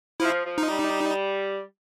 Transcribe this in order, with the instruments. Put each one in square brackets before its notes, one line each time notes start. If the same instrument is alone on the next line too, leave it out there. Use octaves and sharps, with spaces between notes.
[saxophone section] F3 [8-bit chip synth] E4
[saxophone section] F3
[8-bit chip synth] D#4
[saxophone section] G3